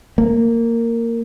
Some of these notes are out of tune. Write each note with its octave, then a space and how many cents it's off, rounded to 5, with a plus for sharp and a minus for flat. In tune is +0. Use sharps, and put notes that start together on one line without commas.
A#3 -15